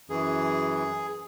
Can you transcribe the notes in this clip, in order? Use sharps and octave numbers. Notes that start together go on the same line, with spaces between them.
F#2 E3 G#4